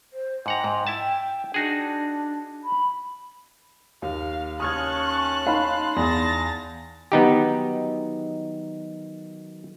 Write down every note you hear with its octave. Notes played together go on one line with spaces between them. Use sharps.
C5
G#2 F#5 G5 A#5
G#2
E4 E5 A5
D4 D#4 F#4 G#4
B5
D#2 F5
C#4 A5 C#6 D#6 F6 F#6 G#6
D#4 F5 B5 C6
E2 A5 A6 A#6
D#3 F#3 B3 D#4 G4